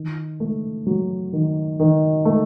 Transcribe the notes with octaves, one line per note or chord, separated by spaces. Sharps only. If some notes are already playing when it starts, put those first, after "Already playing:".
Already playing: D#3
A3
F#3
D#3
D#3
A3